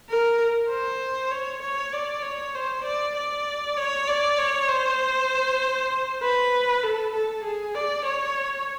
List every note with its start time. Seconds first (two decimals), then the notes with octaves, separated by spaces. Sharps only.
0.09 A#4
0.70 C5
1.31 C#5
1.62 C#5
1.92 D5
2.23 C#5
2.55 C5
2.84 D5
3.15 D5
3.77 C#5
4.07 D5
4.38 C#5
4.68 C5
6.22 B4
6.83 A4
7.14 A4
7.44 G#4
7.74 D5
8.05 C#5